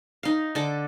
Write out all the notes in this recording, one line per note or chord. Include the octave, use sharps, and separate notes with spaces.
D#4 F5
D3 A4 D6